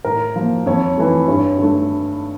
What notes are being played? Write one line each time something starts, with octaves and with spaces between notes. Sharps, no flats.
A2 A#4
F3 A#3
F2 C#5
E3 A3
G2 C#5
D3 A3